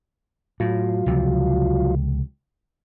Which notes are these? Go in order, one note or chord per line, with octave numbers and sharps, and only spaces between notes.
A2 F#3 F4
C#2 C3 F3